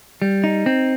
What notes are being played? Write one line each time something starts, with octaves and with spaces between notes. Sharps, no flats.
G3
D#4
C4